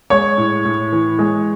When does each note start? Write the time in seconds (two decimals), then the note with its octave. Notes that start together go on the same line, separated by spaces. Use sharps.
0.10 G#3 C#5
0.37 A2
0.65 A2
0.92 E3
1.19 G#3